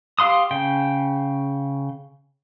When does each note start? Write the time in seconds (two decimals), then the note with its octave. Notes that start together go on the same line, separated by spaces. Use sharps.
0.19 G4 F5 C6 D#6
0.51 C#3 G5